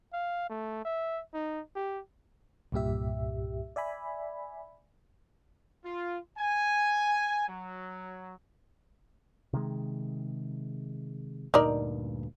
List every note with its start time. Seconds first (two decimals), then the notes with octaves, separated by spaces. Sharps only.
0.13 F5
0.50 A3
0.85 E5
1.34 D#4
1.76 G4
2.72 C2 G2 A#2 G4 E5
3.76 D5 E5 G#5 B5
5.85 F4
6.37 G#5
7.48 F#3
9.53 C3 D#3 G#3
11.54 D2 G2 A#2 D#4 A#4 D5